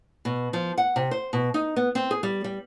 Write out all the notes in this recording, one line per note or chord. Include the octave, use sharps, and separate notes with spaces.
B2
F3
F#5
C3
C5
B2
D#4
B3
C4
G#4
G3
G3